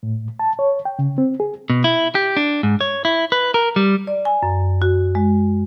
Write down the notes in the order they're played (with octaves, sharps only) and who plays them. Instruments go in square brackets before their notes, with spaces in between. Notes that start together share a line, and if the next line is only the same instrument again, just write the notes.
[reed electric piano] A2
A5
C#5
G5
C#3
C4
G#4
[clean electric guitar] B2
E4
G4
D4
G#2
C#5
E4
B4
A#4
G3
[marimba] D5
G#5
F#2
F#4
G#3